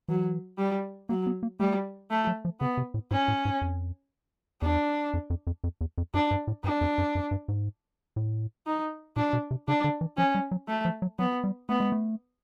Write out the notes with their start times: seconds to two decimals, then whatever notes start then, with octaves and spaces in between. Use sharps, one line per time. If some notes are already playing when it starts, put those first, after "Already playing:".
0.08 E3 F#3
0.58 G3
1.09 F#3 A#3
1.27 B3
1.43 A#3
1.60 G3 A3
2.11 A3
2.27 F#3
2.45 F3
2.60 C#3 B3
2.77 C3
2.94 A2
3.11 G#2 C#4
3.28 A2
3.45 G#2
3.62 F2
4.62 E2 D4
5.14 F2
5.30 F2
5.47 F2
5.64 F2
5.81 E2
5.98 F2
6.14 F#2 D4
6.31 G2
6.47 A2
6.64 G2 D4
6.81 F2
6.98 F#2
7.15 F#2
7.31 G2
7.48 G#2
8.16 A2
8.66 D#4
9.16 A#2 D4
9.33 B2
9.51 C3
9.68 C#3 D4
9.84 D3
10.01 E3
10.17 F3 C#4
10.35 G3
10.51 F#3
10.68 A3
10.85 F3
11.02 F#3
11.19 F#3 B3
11.44 G3
11.69 A3 B3
11.80 G#3
11.92 A3